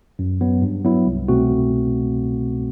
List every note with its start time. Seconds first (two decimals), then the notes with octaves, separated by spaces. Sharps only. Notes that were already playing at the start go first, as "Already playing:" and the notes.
0.19 F#2
0.41 F#3 B3
0.62 G2
0.85 F#3 B3 E4
1.06 C2
1.28 B2 A3 C4 F#4